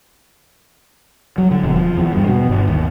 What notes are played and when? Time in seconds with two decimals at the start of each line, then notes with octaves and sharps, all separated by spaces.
1.38 F#3
1.51 D3
1.64 E1
1.76 F3
1.97 E2
2.13 G2
2.27 B2
2.49 G1
2.68 D#2